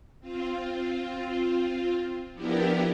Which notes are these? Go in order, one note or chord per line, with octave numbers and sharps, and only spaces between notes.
C4 F4
F3 B3 D4 E4 G4 A#4